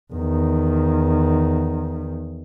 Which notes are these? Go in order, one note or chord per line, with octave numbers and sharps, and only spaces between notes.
E2 D#3